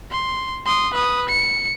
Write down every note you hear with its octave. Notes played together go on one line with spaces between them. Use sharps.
C6
C6 D#6
B4 D#6
C#7